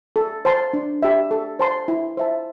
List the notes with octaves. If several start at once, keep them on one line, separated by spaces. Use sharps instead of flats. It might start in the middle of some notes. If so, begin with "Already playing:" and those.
A4
C5 A5 C6
D4
G4 E5
A4
C5 A5 C6
E4
C5 E5 A5